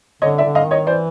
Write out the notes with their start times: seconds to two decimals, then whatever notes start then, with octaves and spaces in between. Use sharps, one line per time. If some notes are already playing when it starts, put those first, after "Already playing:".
0.22 D3 C#5 D#5
0.38 D5 E5
0.44 D3
0.55 D#5 F5
0.65 D#3
0.71 C#5 D#5
0.87 E3 C5 D5